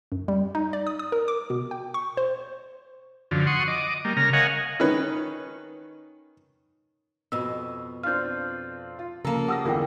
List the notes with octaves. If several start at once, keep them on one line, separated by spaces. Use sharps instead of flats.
F#2
G3
D#4
D5
D#6
D#6
A#4
D6
B2
G5
C#6
C5
F#2 D3 F3
F#5 C6 C#6 D#6
D#5 D6
G3 A#3
C#3 A#4 A#5 F6
A#4 C#5 D#5 F5 F#5 G#5
D#3 C#4 B4
F2 B2 E6
C4 D4 F4 F6 G6
F4
C#3 F3 A#3 A4 A#4 A#5
G4 F#5 D#6 E6 A#6
G1 E2 E4 F4 G#4 A#4 G5